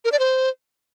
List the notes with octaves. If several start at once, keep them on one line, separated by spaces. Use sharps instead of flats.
A#4
D5
C5